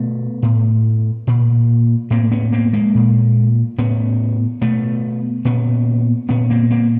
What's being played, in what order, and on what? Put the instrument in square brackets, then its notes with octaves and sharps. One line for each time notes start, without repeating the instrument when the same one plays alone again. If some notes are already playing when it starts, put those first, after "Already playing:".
Already playing: [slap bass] B2 A3 B3
A2
A#2
A2 A#3 C4
B3 C#4
A#3 C4
G#3 A#3
A#2
A2 B3 C#4
B2 A3 B3
A#2 B3 C#4
A#2 B3 C#4
A#3 C4
A#3 C4